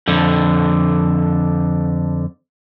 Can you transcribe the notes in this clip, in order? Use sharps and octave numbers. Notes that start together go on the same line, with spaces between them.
F2 D3